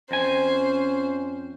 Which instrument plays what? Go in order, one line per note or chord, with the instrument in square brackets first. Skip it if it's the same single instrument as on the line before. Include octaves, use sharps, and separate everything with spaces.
[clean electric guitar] F2 G#5 [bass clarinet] C#4 [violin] C5